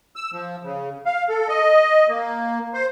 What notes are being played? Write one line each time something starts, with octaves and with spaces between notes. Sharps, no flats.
E6
F3
C#3
F5
A4
D#5
A#3
C5